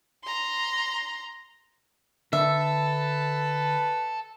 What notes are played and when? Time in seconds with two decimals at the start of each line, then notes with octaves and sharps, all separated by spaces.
0.23 A#5 C6
2.33 D3 A4 B4 E5 A5